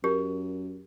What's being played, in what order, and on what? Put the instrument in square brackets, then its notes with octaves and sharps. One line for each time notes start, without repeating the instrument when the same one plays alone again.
[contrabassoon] F#2 [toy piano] G4 [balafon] A#4